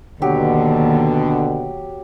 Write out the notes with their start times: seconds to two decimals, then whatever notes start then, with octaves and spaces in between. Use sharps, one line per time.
0.22 D#2 B2 D3 F#3 G4